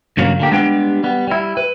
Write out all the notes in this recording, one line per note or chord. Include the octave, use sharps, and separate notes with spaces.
G2 C#3 F#3 A#3
D3 A#3 G4
G3 G#3 B3 D4 D#4 G4
G3 B3
G3 E4
B4